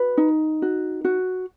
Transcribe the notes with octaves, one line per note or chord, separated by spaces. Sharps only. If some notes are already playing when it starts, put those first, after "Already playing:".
Already playing: F#4 B4
D#4
F#4
F#4